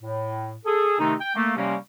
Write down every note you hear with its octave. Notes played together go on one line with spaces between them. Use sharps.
A2
G#4 A4
C3 D#3 A3 D#4
G5
A3 A#3
C3 F3 G3 A#3 C#4